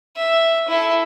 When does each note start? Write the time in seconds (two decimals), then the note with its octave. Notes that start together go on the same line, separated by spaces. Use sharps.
0.16 E5
0.68 E4 A4